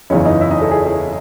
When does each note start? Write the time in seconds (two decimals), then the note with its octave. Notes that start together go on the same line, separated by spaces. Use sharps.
0.10 F#1 E2 C#3 E3 C#4 C#5
0.25 D#4 D#5
0.41 E4 E5
0.51 D#4 D#5
0.61 A4
0.71 G#4
0.86 G#4